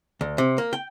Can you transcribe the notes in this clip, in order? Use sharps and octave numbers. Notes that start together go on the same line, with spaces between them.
D2
C3
A#3
G5